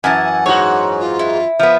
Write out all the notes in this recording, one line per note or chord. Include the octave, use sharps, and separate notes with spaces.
F#2 E3 F#5 G#5 A5
G#2 F#4 C#5
F4
E4
F3 B3 E5